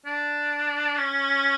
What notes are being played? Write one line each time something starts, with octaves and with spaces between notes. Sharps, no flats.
D4
C#4